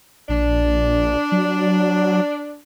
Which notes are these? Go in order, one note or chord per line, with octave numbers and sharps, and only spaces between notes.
A#1 D4
F#3